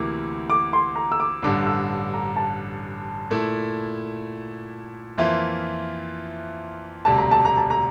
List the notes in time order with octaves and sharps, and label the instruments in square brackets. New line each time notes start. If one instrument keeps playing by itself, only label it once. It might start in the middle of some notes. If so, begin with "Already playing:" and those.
Already playing: [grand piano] D2 C3 E3 A#3 E4 [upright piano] D6
[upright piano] D6
C6
A#5
E6
D6
[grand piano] A1 G2 D3 [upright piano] D6
[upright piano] E6
A#5
A5
[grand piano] A#2 A3 E4
[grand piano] F2 E3 A#3 F4 C5 [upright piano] E5
[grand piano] E1 D2 C3 G3 [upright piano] A5
[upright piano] A#5
A5
A#5
A5
A#5